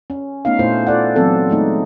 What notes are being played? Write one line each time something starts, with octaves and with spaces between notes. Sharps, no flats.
C#4
A3 B3 C#4 D#4 F5
A#2 A3 E4 C5
F4 A4 D5 F#5
E3 F#3 B3 C4 A4
G#3 A3 D#4